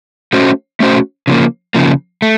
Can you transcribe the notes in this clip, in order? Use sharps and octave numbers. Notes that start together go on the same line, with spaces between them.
A3 C#4 F#4 C5
A3 C#4 F#4 C5
C#3 F3 A#3
C#3 F3 A#3
A3